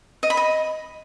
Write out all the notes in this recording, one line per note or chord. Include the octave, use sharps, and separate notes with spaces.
D#5
B5
D#5